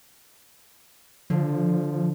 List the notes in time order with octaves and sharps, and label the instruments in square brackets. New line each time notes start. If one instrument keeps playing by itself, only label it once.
[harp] D3 [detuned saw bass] F3